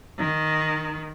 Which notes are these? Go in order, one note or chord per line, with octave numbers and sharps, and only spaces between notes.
D#3